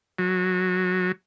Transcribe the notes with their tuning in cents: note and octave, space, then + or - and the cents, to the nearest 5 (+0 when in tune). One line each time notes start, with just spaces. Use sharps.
F#3 -15